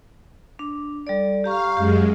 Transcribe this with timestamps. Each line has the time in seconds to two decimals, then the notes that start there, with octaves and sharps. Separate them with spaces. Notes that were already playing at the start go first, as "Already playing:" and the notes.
0.59 D4
1.07 G3 A4 D5
1.44 G4 F5 A#5 C#6
1.77 F#2 G#3 G4